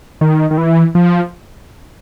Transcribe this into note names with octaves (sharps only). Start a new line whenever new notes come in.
D#3
D#3
E3
F3